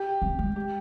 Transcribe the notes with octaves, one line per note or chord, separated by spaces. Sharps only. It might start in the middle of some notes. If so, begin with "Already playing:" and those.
Already playing: G4
C4
G#3
G4